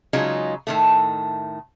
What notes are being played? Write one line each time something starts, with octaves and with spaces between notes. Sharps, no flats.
C#3 F#3 G#3 D#4 F4
A2 D#3 A3